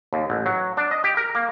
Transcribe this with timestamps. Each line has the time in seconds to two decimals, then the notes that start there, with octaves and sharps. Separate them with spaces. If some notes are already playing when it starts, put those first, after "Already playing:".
0.13 D#2
0.30 A1
0.46 F#3
0.77 D4
0.91 D#5
1.04 G4
1.17 A#4
1.35 A#3